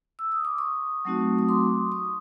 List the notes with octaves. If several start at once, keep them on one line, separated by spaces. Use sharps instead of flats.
E6
D#6
D6
C#6 D#6
F#3 A3 C4 D#4 F#4
D#6
C6 D6
C#6 D#6